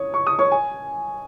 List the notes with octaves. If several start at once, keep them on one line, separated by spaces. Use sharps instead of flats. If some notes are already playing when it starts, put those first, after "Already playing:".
Already playing: C#5 D#6
C#6
D#6
C#5 C#6
G#5